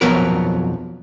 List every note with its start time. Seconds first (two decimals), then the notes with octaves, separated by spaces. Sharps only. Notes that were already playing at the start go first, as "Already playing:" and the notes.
0.01 B1 F2 F3 F#3 B3 A#4